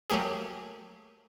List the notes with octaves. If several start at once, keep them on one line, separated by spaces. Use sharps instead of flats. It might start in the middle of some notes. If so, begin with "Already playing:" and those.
F#3 A3 A#3 G4 G#4